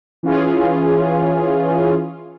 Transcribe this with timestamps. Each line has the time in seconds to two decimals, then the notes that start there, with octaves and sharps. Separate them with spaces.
0.23 E3 C#4 F4 G#4